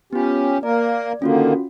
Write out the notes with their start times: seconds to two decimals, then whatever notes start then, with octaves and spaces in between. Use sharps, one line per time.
0.13 B3 C#4 F4 G4
0.63 A#3 A#4 D5
1.22 D3 D#3 A#3 C#4 F4 F#4